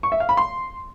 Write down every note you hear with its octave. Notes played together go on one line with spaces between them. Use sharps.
C#6
E5
F5
B5
C6